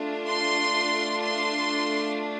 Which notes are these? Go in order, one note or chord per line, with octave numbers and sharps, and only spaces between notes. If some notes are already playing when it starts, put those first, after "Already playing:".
Already playing: A3 D4 F4
C6
C6